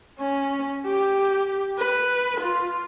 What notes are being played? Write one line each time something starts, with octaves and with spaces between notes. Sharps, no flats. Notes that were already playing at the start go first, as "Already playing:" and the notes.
C#4
G4
B4
F4